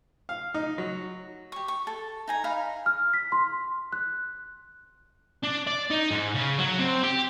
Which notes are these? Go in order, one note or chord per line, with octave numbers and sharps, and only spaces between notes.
F5
D#4
F#3
G4 C#6
C#6
A4
D#4 G#5 A#5
D#4 F5 A#5 B5
F6
B6
C6
F#6
D4
D5
D#4
G#2
C#3
F#3
C4
G4